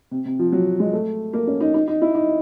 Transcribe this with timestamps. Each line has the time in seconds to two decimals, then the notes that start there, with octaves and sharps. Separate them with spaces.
0.11 C3
0.25 C3
0.39 F3
0.52 F#3
0.80 G#3
0.93 A3
1.33 A#3
1.47 C#4
1.61 D#4
1.74 D#4
1.88 D#4
2.02 E4
2.15 D#4